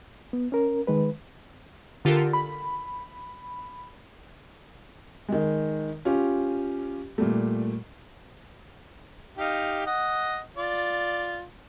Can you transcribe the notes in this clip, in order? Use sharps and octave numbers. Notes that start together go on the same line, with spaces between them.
B3
C#4 A#4
D#3 G#3 B4
D3 F4 G4 A4 A#4
B5
D#3 G#3
C#4 F4 G4
A#2 G3 A3
D#4 G4 F5
D#5 F#5
F4 D5